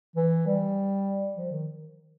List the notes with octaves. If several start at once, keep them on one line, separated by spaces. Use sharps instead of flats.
E3
G3
F3
D#3